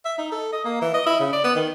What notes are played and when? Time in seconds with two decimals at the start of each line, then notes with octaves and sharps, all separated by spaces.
0.05 E5
0.18 D#4
0.32 A4
0.52 D#5
0.65 A#3
0.81 E3
0.94 D#5
1.06 E4
1.19 C#3
1.33 D5
1.44 B3
1.55 D#3